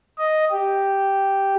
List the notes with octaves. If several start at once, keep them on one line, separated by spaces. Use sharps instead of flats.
D#5
G4